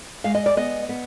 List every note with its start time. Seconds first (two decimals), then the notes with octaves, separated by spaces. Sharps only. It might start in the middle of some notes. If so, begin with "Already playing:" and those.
0.24 G#3 F5
0.35 D#5
0.46 D5
0.57 B3 D#5
0.89 B3